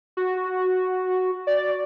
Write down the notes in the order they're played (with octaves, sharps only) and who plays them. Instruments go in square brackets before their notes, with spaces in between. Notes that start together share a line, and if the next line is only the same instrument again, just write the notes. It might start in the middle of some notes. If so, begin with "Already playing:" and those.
[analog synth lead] F#4
D5